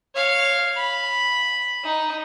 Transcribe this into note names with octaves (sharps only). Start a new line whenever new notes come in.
C#5 F5
B5
D#4